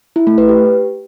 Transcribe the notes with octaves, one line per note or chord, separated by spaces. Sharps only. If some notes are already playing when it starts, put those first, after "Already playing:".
E4
A3
B4
G4